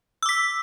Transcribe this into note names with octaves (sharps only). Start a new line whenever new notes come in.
D6 E6 B6